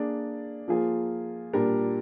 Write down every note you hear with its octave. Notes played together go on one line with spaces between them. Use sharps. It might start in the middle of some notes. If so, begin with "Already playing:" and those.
Already playing: A#3 D4 G#4 D5
F3 A#3 F4 G#4
A#2 G3 D4 G4 A#4